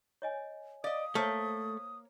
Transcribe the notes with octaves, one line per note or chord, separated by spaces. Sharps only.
C#5 D#5 G#5
D5 D#5 F5 D#6
A3 A#3 C5 C#5 E6